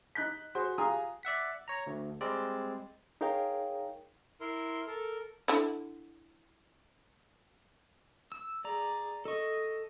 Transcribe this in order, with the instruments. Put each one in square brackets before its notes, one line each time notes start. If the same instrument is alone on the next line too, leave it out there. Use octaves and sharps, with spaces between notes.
[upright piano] D#4 F#6 G6 B6
F#4 G#4 C5 F#5
F4 G4 G#4 G#5 A#5 D#6
[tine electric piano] D5 E5 F#5 B6
C#5 A#5
D2
G3 G#3 C4 D5
[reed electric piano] D#4 G#4 A#4 C#5 F5 G5
[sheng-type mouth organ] E4 A#4 C6
A4 A#4
[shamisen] D3 E4
[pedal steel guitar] E6
[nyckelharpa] G#4 D6 [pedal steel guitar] D5 A#5
[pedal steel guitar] A4 C#6 [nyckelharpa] D#5